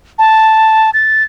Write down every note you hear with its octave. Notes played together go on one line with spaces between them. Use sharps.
A5
A6